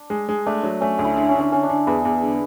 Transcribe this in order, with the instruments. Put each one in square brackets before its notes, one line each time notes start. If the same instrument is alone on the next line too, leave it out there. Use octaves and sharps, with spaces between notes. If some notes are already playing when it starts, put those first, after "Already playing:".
Already playing: [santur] D4
[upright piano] G#3
G#3
[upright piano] A3 [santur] D4
[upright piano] F#3
[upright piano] A3 [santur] C#4
[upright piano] D2
[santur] E4
[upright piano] D3
[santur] C#4
[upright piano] D3
[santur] C#4
[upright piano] D3 [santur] C#4
[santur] D4
[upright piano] D3
[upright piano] E2 [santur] G#4 B4
[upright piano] E2
D3